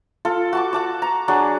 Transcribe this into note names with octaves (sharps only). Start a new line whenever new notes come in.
F4 A4
F#4 A5 D6
F#5 A5 D6
A#5
F#3 D4 G#4